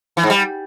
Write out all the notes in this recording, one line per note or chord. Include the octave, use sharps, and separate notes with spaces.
E3
G#2
G3